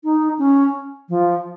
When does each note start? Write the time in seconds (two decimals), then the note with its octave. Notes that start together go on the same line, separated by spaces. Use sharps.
0.04 D#4
0.39 C#4
1.09 F3